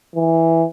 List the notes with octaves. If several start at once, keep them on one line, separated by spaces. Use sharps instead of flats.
E3